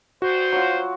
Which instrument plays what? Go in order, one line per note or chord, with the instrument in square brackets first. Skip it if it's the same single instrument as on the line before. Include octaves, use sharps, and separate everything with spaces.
[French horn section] G2 C5 [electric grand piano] F#4
[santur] F#3 F4